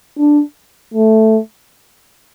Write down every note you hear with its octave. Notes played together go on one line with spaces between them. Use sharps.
D4
A3